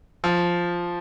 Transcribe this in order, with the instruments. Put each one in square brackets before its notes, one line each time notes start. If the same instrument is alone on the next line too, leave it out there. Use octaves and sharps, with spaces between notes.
[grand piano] F3